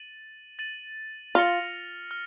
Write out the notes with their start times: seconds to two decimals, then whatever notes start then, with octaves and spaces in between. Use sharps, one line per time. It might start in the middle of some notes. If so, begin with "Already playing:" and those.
Already playing: A6 D#7 F#7
0.59 A6 D#7 F#7
1.35 F4 F6 A#6 C#7 F7
2.11 F6